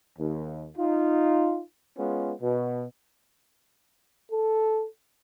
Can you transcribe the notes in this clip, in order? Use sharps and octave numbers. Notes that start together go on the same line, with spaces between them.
D#2
D#4 F4
G#3 B3 C#4 F4
B2
A4